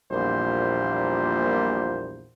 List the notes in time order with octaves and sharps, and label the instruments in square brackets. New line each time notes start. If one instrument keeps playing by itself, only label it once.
[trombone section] A#1 E2 A#2 G3 A#3 C5